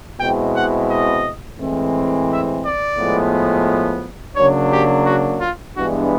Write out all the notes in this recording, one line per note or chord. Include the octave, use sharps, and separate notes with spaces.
B2 G#3 C4 E4 G5
F#5
D#5
A2 E3 G#3 C4
E5
D5
A2 F3 G#3 B3
C#3 F#3 A#3 D4 C#5
G4
F#4
F4
G2 E3 G#3 B3 D4 F#4